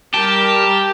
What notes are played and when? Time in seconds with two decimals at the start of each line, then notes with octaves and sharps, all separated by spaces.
0.14 G3 G4 A#4 A5